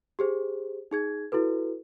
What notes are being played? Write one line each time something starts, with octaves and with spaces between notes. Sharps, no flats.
G4 G#4 C5
D#4 G#4 G#6
E4 F#4 A4 B4